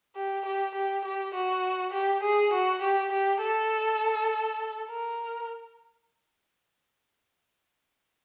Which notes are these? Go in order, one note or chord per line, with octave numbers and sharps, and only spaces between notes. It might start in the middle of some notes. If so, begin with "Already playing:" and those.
G4
G4
G4
G4
F#4
G4
G#4
F#4
G4
G4
A4
A#4